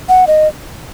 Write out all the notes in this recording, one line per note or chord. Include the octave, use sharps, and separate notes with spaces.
F#5
D#5